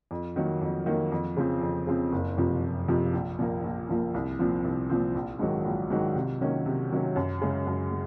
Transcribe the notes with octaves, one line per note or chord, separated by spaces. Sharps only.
F2
D#3 F#3 A#3
F2
D#3 F#3 A#3
F2
C#3 F3 C4
F2
C#3 F3 C4
F#1
F2 C3 F3
F#1
F2 C3 F3
A#1
A#2 F3 A#3
A#1
A#2 F3 A#3
C2
A#2 F3 C4
C2
A#2 F3 C4
A#1
G#2 D#3 F#3
A#1
G#2 D#3 F#3
C3
D#3 F#3 A#3 C#4
C3
D#3 F#3 A#3 C#4
F#2
C#3 G#3
F#2
G#3